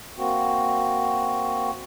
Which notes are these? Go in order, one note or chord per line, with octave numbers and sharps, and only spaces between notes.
A#3 C4 F#4